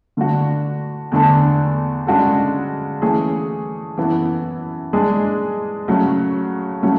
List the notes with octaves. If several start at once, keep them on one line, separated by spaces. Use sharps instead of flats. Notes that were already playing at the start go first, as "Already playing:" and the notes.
D3 A3 D4 F#4
E2 D3 A3 D4 A4
C#3 G#3 D4 F#4 A4
E3 A3 C#4 G#4
F#2 E3 B3 E4 A4
G#3 D4 G#4
C#3 F#3 A3
C#3 F#3 A3 C#4